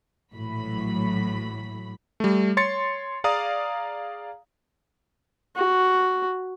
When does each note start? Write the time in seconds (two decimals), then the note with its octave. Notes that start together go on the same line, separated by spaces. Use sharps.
0.35 A#1 A2 E3 F#3 B5
2.20 G3 A3
2.57 C#5 C6 A6 C#7
3.24 G#4 D5 F5 A#5 D#6
5.56 F#4